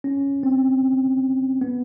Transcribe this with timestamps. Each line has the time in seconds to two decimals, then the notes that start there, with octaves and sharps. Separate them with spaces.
0.04 C#4
0.43 C4
1.61 B3